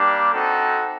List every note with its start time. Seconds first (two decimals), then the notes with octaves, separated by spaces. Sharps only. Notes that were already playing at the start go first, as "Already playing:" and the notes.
Already playing: G3 A#3 D4 G4
0.32 C4 D#4 F#4 A4